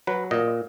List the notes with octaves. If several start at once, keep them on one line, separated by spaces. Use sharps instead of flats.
F#3 B4
A#2 D#5